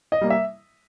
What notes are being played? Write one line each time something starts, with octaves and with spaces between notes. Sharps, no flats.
D#5
G3 A#3
E5